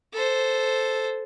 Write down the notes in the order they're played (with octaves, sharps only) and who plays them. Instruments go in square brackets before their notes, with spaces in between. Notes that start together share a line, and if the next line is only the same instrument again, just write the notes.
[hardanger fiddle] A4 C5